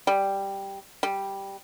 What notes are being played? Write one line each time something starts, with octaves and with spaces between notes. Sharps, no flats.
G3
G3